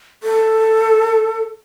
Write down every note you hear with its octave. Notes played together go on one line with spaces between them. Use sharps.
A4